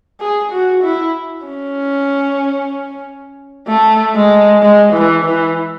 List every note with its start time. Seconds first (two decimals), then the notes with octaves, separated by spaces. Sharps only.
0.20 G#4
0.52 F#4
0.83 E4
1.46 C#4
3.68 A3
4.15 G#3
4.62 G#3
4.93 E3
5.25 E3